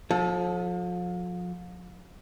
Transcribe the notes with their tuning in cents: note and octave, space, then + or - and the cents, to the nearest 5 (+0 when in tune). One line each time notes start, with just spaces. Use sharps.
F3 +35 A4 -20